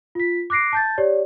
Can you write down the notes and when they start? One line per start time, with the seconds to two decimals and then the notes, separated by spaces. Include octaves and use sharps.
0.15 F4 B6
0.50 D6 F#6 A#6 C7 D7
0.73 A5 G6 A6
0.98 G4 C#5 D5